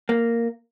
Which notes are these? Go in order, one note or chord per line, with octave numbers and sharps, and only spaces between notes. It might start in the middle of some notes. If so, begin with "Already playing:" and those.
A#3